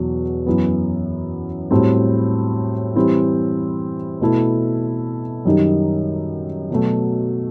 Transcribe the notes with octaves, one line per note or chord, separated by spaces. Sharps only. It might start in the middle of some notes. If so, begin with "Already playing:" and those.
Already playing: E2 B2 F#3 F#4
F#2 E3 B3
A2 G3 C4 F#4
E3 G3 C4 E4
B2 A3 E4 A4
F#2 D#3 G3 D#4
B2 F#3 A3